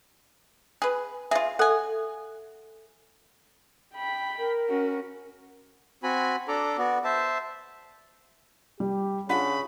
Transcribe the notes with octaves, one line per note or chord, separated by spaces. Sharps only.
G#4 B4
F4 G#4 E5 C6
A4 F#5 G#5
G5 B5
A#4
C#4 F#4
C4 F#4 G#5 B5
D4 A4 A#5 D6
B3 F#4 D5
C5 E5 A5
G3 G4
C#3 D4 F4 F#5 B5